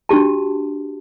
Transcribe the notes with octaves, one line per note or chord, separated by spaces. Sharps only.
D4 F#4 G4 A5